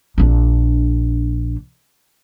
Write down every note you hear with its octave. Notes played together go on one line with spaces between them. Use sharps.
A#1 D4